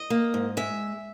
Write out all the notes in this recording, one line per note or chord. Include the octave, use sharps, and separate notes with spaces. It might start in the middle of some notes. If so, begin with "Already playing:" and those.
Already playing: D#5
A#3
G#2
G#3 E5